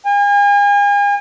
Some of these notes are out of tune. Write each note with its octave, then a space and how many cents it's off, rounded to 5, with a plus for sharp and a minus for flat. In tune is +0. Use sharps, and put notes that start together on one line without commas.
G#5 -40